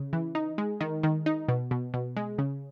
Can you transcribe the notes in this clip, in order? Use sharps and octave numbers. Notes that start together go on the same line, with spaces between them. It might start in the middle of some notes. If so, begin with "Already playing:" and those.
Already playing: C#3
E3
D#4
G#3
D#3
D#3
D#4
B2
B2
B2
G#3
C#3